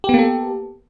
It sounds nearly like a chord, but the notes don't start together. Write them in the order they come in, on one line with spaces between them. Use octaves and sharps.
G4 B3 A#3 A4